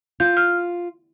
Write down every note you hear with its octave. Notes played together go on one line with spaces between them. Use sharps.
F4 G6
F6